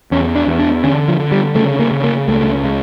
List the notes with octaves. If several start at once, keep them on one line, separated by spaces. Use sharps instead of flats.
E2 C#4
D4
E2
D4
D3 C#4
F3
D3
G3
C#3 A3
A#3
C#3
A#3
C#2 A3
C#3